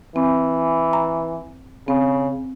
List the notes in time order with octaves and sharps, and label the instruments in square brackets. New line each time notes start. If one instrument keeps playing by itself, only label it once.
[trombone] E3 [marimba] C4
[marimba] A#5
[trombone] C#3 [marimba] C4